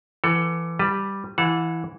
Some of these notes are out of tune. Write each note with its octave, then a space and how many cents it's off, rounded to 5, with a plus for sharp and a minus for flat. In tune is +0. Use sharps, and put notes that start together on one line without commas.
E3 +25 A4 +25 F#5 +0
G3 +0 B4 +0 A5 +30
E3 +0 F#5 -30 A5 +0